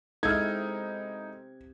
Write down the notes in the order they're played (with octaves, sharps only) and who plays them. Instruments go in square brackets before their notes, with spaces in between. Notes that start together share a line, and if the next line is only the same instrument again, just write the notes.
[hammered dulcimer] C3 [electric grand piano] G#3 D#4 E4 [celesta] A4 E6 F6 [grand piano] G#6